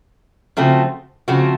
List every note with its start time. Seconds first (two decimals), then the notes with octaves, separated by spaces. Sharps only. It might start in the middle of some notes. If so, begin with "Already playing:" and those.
0.57 C#3 F3 A3 C4 F#4
1.28 C#3 F3 A3 C4 F#4